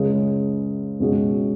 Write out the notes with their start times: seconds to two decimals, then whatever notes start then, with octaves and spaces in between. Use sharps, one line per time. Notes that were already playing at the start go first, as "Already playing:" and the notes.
Already playing: C#2 C#3 G#3
1.00 C#2 B2 G#3 C#4 F#4